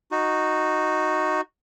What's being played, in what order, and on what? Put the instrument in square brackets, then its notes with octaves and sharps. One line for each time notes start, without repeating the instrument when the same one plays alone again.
[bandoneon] D#4 F#4